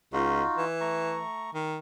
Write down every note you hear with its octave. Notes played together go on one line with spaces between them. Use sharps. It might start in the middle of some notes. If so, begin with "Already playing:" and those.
C#2 D#4 F4 F#4
E3
A3 A#5 C#6
D#3